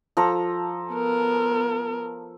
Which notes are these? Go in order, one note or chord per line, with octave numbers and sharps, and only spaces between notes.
F3 A4 A#5
B3 A#4